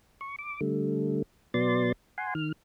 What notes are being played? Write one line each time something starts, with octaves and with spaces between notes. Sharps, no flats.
C#6
D6
D3 G3 A3
B2 F#3 B3 D5 C6 A6
F#5 G#5 C6
D#3 F6